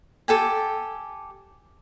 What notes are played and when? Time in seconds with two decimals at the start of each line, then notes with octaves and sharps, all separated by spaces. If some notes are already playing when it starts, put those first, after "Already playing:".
0.28 G4 A4 G5 G#5